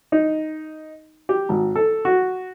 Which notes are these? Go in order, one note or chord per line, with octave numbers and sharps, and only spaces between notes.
D#4
G4
G#1
A4
F#4